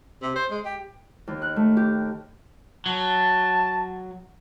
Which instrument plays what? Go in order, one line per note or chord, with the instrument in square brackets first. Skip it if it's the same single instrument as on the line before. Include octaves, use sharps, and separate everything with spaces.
[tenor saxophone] C3
C5
G#3
G4
[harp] D#2
F#6
A3
G4
[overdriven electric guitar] F#3 [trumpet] A5